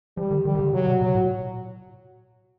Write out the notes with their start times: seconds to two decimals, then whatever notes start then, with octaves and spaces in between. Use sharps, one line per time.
0.17 F3 G3
0.31 D#3
0.45 D#3 G3
0.55 D#3
0.59 D3
0.73 C#3 F#3
0.87 C3
1.01 B2 F#3
1.15 A#2